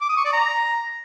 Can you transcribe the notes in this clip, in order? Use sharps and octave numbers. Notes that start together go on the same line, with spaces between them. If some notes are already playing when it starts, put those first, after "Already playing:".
D6
D#6
C#6
D5
A#5